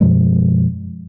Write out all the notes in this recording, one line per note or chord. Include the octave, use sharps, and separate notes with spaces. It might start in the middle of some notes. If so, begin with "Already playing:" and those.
F#2 B2 F3 G#3